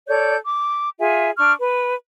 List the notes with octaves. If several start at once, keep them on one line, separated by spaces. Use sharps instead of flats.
A4 C#5 D5 G6
D6
F4 G#4 E5 G#5
D4 C#6 F6
B4